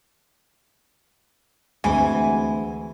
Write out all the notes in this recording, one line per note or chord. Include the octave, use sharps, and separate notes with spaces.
D2 E3 G#3 C4 F#4 G#5